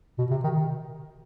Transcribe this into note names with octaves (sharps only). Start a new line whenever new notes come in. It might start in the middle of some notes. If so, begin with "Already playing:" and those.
B2
C3
D#3